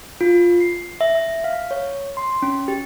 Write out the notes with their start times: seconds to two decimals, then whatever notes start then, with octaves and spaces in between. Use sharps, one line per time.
0.21 F4
0.60 C7
1.01 E5
1.15 E5
1.44 F5
1.71 C#5
2.17 C6
2.42 C#4
2.68 G4